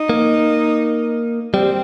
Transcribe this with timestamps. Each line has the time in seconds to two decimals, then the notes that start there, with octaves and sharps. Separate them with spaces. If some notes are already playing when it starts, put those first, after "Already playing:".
Already playing: D#4
0.10 A#3
1.54 G3 C4